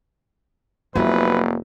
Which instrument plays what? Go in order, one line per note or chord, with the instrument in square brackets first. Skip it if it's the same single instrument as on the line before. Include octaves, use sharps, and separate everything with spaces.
[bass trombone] F1 [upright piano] F#3 B3 E4 [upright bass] A#3 [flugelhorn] B4